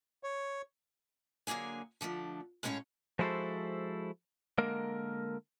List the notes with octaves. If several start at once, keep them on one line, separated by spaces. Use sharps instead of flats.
C#5
D3 F#3 A#3 G#4 G#5
D3 F3 A3 D4
A2 G#3 B3 C#4 C#5 F5
F3 G#3 E4 F#4 A4 C5
D3 G#3 A#3 A#4